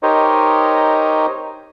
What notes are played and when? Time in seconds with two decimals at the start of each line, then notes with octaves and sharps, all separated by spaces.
0.03 D#4 G4 A#4 C5 C#5 D#5